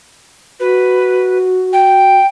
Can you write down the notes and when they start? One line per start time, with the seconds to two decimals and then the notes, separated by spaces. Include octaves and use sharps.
0.60 F#4 B4
1.73 G5